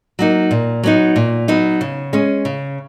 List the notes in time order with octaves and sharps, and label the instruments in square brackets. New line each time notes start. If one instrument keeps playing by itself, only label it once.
[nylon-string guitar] F#3 A#3 D#4
A#2
F#3 B3 D#4
A#2
F#3 B3 D#4
C#3
G#3 C#4
C#3